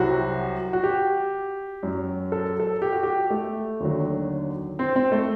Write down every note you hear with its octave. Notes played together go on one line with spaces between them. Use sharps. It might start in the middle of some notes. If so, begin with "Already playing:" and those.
Already playing: C2 C3 F#3 F#4
F#4
G4
F#2 F#3
A4
A4
G4
F#4
G4
A3
D#2 D3 F#3
C4
C4
A3